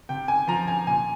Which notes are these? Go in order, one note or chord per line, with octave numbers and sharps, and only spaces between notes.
C3 G5
G#5
F3 A#5
G#5
A#2 G#5